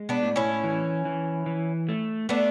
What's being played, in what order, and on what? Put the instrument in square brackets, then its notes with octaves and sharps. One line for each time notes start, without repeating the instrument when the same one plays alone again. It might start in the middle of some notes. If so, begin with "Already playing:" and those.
Already playing: [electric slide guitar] G#3
[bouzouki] B3 D4
[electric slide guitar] A2
[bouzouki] C#4 E4
[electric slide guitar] E3
E3
E3
A3
[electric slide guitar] A3 [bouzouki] B3 D4